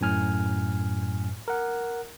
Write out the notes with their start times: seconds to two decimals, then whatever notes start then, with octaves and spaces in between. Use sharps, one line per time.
0.01 F#2 A2 G#5 F6
1.48 A#4 F#5